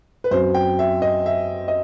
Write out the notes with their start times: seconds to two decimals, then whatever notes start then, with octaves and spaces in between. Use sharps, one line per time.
0.24 B4
0.31 F#2 F#3 C4 C5
0.54 G5
0.79 E5
1.02 D#5
1.26 E5
1.68 D#5